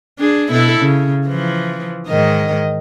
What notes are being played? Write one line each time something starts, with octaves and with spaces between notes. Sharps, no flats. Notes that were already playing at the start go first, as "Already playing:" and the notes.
D4 G#4
B2 E4 A4
C#3
E3 F3
G#2 D#3 D#5